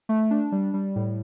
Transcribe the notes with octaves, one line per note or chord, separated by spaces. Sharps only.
A3
D4
G3
G3
A2